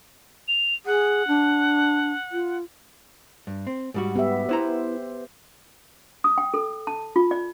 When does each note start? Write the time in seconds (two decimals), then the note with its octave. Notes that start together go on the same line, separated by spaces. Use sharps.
0.48 F7
0.86 G#4 F#5
1.28 D4
2.32 F4
3.47 G2
3.67 C4
3.94 G#2 G3 F#4
4.16 B3 G4 E5
4.49 B3 E4 C5 A#5
6.24 D#6
6.38 G5
6.54 A4
6.87 A5
7.16 F4
7.31 D5